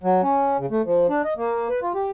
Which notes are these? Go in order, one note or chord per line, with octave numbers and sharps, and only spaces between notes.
F#3
C#4
C#3
A3
F3
D4
D#5
A#3
B4
F4
G4